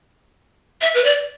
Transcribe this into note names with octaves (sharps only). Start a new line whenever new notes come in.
E5
B4
D5